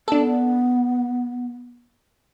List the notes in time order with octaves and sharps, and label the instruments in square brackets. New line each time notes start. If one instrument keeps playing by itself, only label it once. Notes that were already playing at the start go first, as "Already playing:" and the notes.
[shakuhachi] B3 [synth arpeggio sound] D4 A4